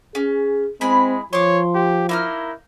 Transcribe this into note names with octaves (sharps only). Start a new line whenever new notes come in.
C#4 G#4
G#3 C4 E4 G#4 B5
F3 C#5 C6 D6
G4
A#3 D#4 E4 F6